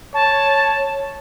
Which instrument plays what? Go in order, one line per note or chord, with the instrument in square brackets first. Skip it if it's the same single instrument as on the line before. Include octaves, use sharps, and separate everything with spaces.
[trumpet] C#5 [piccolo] A5